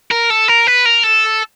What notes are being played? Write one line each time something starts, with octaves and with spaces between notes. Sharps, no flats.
A#4
A4
A#4
B4
A#4
A4